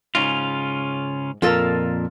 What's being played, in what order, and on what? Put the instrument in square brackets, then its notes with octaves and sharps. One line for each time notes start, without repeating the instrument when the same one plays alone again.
[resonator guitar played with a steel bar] G#2 [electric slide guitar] C#3 C#4 F4
[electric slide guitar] F2 A#2 [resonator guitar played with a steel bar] F4 A4 A#4